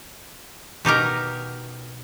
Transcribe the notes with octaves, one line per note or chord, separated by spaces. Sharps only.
B2 D#4 G4 A#4